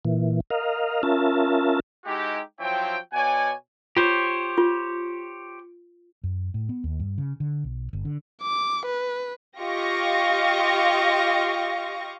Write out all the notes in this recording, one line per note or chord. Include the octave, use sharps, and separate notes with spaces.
A#2 E3
A#4 D#5 F5
C#4 F4 A#4 E5 A5
G#3 D#4 E4 F#4 G4
F3 F#3 C4 E4 C#5 G5
B2 C#5 D5 F#5 G#5
F4 G4 C5 C#5
F4
F#2
A2
B3
D#2
G2
C#3
D3
B1
G1
D3
D6
B4
F4 G4 D#5 F5 C#6 A#6